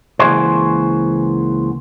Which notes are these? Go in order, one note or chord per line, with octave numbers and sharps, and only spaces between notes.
C#2 E3 A#3 F#4 G#4 C5